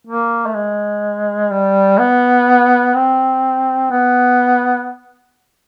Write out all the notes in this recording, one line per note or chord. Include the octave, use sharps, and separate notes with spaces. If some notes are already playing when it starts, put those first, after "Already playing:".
A#3
A3
G#3
G3
B3
C4
B3